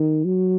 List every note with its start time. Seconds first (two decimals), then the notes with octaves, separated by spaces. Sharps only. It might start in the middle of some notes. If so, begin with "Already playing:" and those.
Already playing: D#3
0.25 F#3